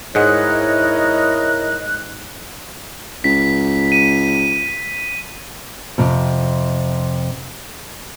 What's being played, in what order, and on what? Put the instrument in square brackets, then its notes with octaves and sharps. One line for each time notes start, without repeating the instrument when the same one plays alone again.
[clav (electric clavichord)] G#2 G#3 F#5 [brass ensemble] E4 A#4 [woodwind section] C#5 D#5 [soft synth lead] F#6
[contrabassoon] C#2 [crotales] B6
[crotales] D#7
[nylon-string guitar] F2 C3